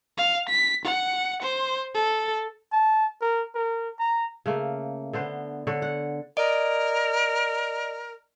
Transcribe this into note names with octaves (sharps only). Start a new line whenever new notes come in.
F5
B6
F#5
C5
A4
A5
A#4
A#4
A#5
C#3 A3 A#3
D3 B3 C5
D3 C#5
F#5
A#4 D5 D#5 D7